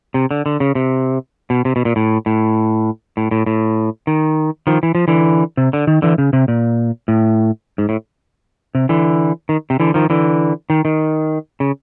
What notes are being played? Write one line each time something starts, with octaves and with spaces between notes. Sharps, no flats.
C3
D3
D3
C#3
C3
B2
C3
B2
A#2
A2
A2
A2
A2
A2
D#3
D#3 F3
E3
F3
D3 E3
C3
D3
D#3
D3 E3
C#3
C3
A#2
A2
G#2
A2
C3
D3 E3
D#3
C3
D3 E3
D#3 F3
D3 E3
D#3
D#3
C#3